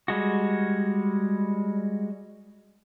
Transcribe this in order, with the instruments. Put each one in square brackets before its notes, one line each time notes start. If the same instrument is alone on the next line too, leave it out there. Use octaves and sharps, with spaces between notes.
[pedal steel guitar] G3 G#3 F#4